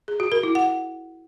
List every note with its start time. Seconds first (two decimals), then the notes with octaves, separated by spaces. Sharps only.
0.08 G#4
0.20 F#4
0.32 A#4
0.43 E4
0.55 F#5